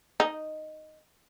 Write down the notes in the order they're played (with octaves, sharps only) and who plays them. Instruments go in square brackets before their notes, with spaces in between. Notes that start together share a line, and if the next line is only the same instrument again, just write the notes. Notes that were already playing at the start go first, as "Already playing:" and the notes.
[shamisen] D#4